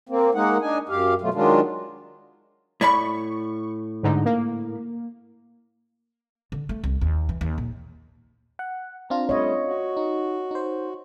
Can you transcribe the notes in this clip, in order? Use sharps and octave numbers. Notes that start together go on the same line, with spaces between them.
A#3 C4
G#3 A#3 D#4 F#5
D4 D#4 G#5
F#2 G4 F5
B2 F#3 A3 F4
D#3 F#3 G#3 D4 F4
A2 D5 B5 C#6
G#2 D3 D#4
A#3
D3
A3
C2
D#2
E3
D#2
A#1
F#5
C4 D4 F4 A#5
G3 A3 C#5 D#5
F#4
D#4
D#4 C5